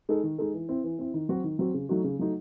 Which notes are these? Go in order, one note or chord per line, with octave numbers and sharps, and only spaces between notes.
G#3 D#4 A4
D#3
G#3 D#4 A4
E3
C4 E4
E3
C4 E4
D#3
F#3 C4 F#4
D#3
F#3 C4 F#4
C#3
F#3 A3 D#4 F#4
C#3
F#3 A3 D#4 F#4